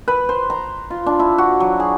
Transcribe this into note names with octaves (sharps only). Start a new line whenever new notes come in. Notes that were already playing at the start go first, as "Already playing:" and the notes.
B4
C5
A#5
F4
D4
E4
F#4
F#3
G#4